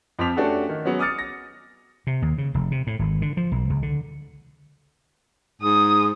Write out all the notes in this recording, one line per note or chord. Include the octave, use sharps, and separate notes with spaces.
F2 F3 C4 D6 B6 F7
A3 C#4 D4 F#4 G4 A4
D#3
F#3 G#3 B3 C#4
D6 D#6 F6 A6 C#7
A#6
C3
D#2
C#3
F1
C3
A2
G#1
D3
F3
B1
C#2
D3
G#2 D#6